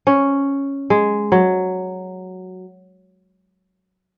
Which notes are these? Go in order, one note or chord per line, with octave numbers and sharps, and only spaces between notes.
C#4
G#3
F#3